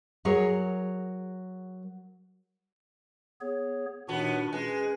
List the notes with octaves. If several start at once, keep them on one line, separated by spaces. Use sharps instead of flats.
F#3 G#4 A#4 C#5
B3 G#4 C#5
D#2 A#2 B3 D4 F#4
G#3 C#4 B4